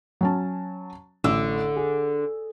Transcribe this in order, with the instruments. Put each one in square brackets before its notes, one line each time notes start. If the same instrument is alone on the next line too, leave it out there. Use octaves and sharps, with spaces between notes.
[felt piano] F#3 C#4 A5
[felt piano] A1 E6 [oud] D3
[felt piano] G#4